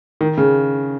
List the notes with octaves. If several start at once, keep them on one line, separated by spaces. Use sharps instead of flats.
D#3
C#3